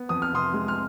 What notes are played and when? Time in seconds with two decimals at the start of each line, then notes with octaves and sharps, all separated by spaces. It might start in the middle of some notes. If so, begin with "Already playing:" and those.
Already playing: B3
0.09 F2 D#6
0.22 F6
0.32 C3 C6 D#6
0.53 G#3
0.68 F6